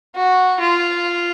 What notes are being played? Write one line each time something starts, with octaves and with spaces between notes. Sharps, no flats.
F#4
F4